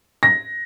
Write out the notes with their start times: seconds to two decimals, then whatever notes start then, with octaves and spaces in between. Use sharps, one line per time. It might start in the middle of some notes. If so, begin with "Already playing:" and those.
0.23 A#6